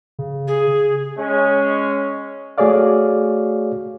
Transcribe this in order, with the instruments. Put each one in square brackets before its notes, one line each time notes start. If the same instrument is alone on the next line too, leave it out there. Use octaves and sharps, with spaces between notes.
[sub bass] C#3
[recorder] G#4
[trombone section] G#3 C#4
[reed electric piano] A3 F#4 G#4 C#5 D5 F5